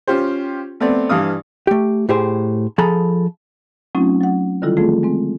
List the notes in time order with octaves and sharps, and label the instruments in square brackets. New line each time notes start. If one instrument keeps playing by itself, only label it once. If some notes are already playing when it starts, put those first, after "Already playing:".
[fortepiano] C#4 F4 G4 C5
A3 B3 C4 D5
G2 E3 F5 D#6
[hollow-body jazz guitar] A3 G4
A2 G4 G#4 C5
F3 G#4 A4 A#5 B5
[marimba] F#3 A3 C4 C#4 D#4 F4
F#3 F#5
D3 D#3 G3 E4 F4 A4
F3 A3 C4 F4 G#4 A4
G#3 C4